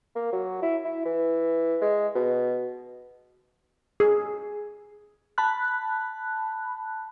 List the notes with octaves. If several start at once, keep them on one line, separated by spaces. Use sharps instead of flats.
A#3
F#3
E4
E4
E3
G#3
B2
G#4
A5 B5 F#6